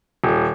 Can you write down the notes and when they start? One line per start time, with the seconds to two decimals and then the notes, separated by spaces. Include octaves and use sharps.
0.24 D#1